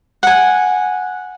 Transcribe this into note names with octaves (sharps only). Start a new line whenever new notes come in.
F#5 G#5